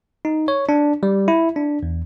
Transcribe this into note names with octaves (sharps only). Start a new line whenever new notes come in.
D#4
C#5
D4
G3
E4
D4
E2